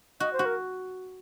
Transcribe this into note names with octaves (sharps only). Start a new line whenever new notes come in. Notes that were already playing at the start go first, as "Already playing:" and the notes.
F#4 D#5
C5
F#4
A#4